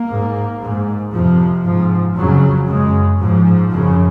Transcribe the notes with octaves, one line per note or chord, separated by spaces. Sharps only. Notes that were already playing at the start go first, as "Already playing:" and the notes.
Already playing: A#3
G#2
G#2
F2 C3 F3
G#2 F3
F2 C#3 F#3
F#2 C#3 G#3
G#2 F3
F#2 C#3